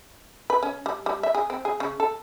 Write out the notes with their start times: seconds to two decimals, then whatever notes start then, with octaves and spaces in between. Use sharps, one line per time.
0.50 B4
0.63 C#4
0.86 G3
1.06 G3
1.23 E5
1.35 G#4
1.50 C4
1.65 G#4
1.80 C#3
2.00 A4